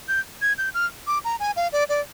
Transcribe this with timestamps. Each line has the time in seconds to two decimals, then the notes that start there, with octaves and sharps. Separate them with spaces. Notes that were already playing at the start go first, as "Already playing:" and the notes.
0.08 G6
0.42 G#6
0.58 G6
0.74 F6
1.07 D6
1.24 A#5
1.40 G#5
1.56 F5
1.72 D5
1.89 D5